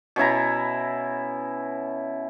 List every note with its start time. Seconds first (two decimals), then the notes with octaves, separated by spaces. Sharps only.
0.16 B2 C#4 E4 A#5